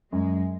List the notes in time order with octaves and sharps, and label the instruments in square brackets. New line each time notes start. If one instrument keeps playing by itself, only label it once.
[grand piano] F#2 [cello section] G#3